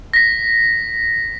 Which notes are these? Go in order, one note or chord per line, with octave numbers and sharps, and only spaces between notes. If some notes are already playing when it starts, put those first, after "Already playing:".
A#6 B6